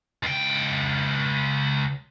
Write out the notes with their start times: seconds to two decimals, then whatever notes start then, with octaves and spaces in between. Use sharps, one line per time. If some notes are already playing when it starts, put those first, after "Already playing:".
0.23 C#2 G5